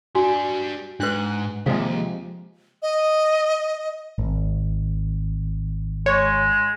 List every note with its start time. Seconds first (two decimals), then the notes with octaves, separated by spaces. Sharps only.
0.15 G3 D4 F#4 G#5
1.00 G#2 D4 B4 F#6
1.66 D#2 C3 F3 G#3 D#5 F5
2.82 D#5
4.18 G#1
6.06 G#3 C#5